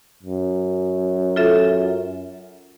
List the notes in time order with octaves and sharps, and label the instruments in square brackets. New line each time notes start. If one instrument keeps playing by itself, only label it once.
[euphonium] F#2
[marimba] F4 A4 E5